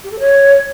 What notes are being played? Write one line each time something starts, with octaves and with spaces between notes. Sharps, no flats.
G4
A4
C#5